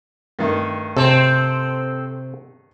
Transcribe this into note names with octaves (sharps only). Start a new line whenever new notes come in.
G2 D#3 A3
C3 C4 A4